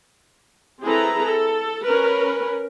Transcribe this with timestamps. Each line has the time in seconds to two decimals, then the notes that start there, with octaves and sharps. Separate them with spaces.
0.83 C4 E4 G#4 A4 B4 A#5
1.23 A4
1.85 C#4 A#4 B4